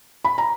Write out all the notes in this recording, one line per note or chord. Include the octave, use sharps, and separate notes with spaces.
B5
A#5